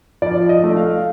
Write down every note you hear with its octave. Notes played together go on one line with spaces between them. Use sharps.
F3 D5
D#5
A3
F5